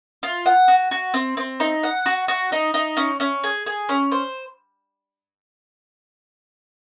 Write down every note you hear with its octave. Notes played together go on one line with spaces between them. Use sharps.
F4
F#5
F#4
F#4
C4
C4
D#4
F#5
F#4
F#4
D#4
D#4
C#4
C#4
G#4
G#4
C#4
C5